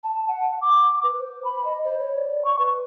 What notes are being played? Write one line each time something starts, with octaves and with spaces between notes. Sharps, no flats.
A5
F#5
D6
B4
C5
B5
D#5
C5
C#5
D5
C#6
B4